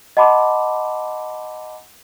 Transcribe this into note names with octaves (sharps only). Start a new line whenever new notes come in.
D#5 F#5 A5 B5 C6 D6